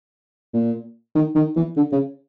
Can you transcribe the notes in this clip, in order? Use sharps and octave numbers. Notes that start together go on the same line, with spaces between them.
A#2
D#3
D#3
E3
D3
C#3